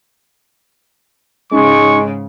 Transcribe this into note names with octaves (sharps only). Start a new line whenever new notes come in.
G#2 C#3 G#3 C#4 D#4 C#6